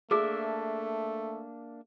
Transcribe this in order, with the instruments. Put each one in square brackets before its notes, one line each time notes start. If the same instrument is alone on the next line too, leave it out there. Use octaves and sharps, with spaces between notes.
[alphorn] A3 [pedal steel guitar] A#3 D4 E5 [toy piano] G#4